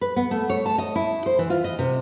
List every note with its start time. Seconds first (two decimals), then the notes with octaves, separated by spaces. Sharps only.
0.01 B4
0.16 B3
0.31 A3
0.50 C#5
0.66 A5
0.78 D#5
0.96 E4
1.26 C5
1.39 E3
1.50 F4
1.64 D#5
1.79 C3